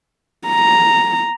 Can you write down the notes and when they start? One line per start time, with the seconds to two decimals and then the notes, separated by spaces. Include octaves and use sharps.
0.47 A#5